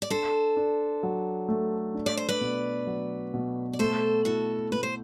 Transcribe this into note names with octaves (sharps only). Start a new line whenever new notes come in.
D5
D4 A4 C5
D4
F#3
A3
D4
D5
C5
B4 D5
B2
F#3
B2
D5
A3 A4 C5
E4 F#4 A4
A3 B4
C5